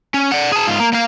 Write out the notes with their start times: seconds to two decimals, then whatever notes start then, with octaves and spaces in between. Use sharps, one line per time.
0.14 C#4
0.32 D5 F#5
0.52 G#4 A5
0.67 G#2 F4
0.80 A#3
0.93 A#3 F5